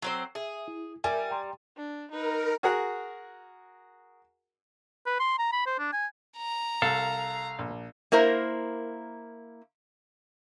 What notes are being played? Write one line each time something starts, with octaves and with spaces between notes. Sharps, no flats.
F#3 C4 C5
G#4 E5
E4
G3 A#4 D5 E5 G#5
G5 A#5 C6
D4
D#4 A#4 B4
F#4 G#4 A#4 F#5
B4
C6
A#5
B5
C5
D4
G#5
A#5
C2 A4 F5
A#1
A#3 E4 A#4 C5